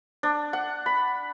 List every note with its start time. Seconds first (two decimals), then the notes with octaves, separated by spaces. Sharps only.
0.23 D4
0.53 F#5
0.86 B5